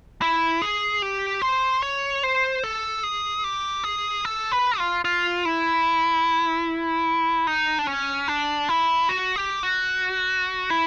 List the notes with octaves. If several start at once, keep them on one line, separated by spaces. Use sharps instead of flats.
E4
G#4
G4
C5
C#5
C5
A4
G#4
G4
G#4
A4
B4
F4
F4
E4
D#4
D4
C#4
D4
E4
F#4
G4
F#4
E4